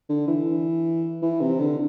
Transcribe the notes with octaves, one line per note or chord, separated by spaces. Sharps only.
D3
E3
E3
C3
D3